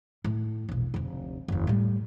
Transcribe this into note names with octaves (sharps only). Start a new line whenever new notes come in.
A2
E1 A#1
F1 D2
F#1 E2
A2 G3